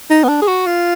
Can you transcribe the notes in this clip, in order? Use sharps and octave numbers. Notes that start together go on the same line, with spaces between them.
D#4
B3
D4
G#4
F#4
F4